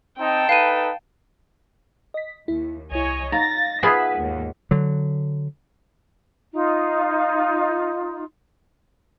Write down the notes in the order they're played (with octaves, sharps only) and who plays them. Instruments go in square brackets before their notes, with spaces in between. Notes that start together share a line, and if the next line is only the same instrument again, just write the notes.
[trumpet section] C4 D#4 [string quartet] G5 A5
[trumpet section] D#4 A4 B4 [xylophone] F5 D#7
[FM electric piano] D#5 B6
[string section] D#2 [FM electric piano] E4
[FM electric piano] C2 E4 [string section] C#5 D#5 G#5
[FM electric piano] D#4 F5 [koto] A#5 [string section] A6 A#6
[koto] B3 F4 G#4 [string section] B4 E5
[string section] D#2 G#2
[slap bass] D3 F#3
[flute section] D#4 F4